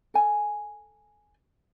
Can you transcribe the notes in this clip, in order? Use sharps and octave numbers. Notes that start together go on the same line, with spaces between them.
A4 G#5